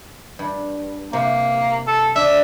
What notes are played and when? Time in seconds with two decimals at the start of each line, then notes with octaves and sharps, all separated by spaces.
0.39 G2
1.13 C3 A#3
1.88 A4
2.16 D4 E5